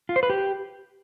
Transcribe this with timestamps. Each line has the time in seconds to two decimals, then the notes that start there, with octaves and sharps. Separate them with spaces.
0.09 F4
0.16 C5
0.23 B4
0.30 G4